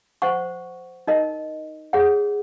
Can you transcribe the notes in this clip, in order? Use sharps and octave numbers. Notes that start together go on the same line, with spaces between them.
C5 F#5 C#6
D#4 A#4 D#5
G#4 C#5 F#5